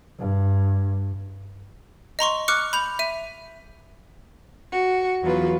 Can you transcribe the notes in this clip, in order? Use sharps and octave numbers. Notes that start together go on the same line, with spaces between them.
G2
D#5 A#5 C6 C#6
C#6 D6 F6 F#6 C#7
B5 G6 F7
E5 D#7
F#4
E2 F#3 F4 B4